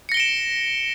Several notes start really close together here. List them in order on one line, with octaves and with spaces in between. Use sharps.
C#7 A#6 G7 D7 E7